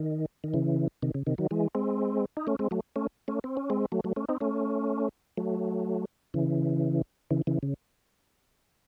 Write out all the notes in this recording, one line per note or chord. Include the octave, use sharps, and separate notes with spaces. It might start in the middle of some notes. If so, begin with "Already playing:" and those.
Already playing: D#3
D#3
C#3 E3
C3 D#3
C#3
C3 D#3
D#3 F#3
E3 G#3
G#3 C4
D#4
A3 C#4
G#3 C4
F#3 A3
A3 C#4
A3 C#4
C4
C#4
G#3 C4
F#3 A3
F#3 A3
A3 C#4
C4 D#4
A3 C#4
F#3 A3
C#3 E3
C#3 E3
C#3 E3
C#3